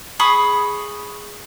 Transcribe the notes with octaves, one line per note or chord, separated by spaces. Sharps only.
G#4 B5 C#6 D#6